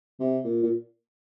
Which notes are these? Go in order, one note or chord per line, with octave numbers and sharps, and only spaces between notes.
C3
A#2
A#2